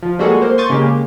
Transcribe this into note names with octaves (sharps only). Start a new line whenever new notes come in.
F3
G3 G#3 A#3 F#4 G#4 A4
A#3 C5
C6 C#6 D#6 G6 A6
C#3 G#3 A#3 G4